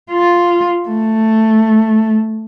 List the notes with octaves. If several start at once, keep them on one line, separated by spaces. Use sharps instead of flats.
F4
A3